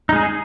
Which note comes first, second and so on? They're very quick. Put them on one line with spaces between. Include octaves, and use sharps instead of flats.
D#4 G#3 G#4